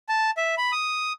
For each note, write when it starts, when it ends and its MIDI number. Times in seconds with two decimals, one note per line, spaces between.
0.09 0.31 81
0.37 0.55 76
0.58 0.72 83
0.72 1.13 87